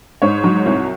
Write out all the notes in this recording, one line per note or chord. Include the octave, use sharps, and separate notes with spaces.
G#2 C#5
F#3
C2